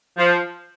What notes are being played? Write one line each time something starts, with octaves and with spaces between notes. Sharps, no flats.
F3